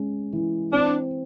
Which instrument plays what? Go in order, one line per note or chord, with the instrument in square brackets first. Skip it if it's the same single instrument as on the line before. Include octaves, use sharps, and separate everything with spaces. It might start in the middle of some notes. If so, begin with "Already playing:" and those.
Already playing: [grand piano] G#3 C#4
E3
[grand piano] C4 [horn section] D4